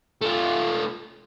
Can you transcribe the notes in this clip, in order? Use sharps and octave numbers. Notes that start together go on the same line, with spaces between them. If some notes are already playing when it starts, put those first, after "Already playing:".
A3 F4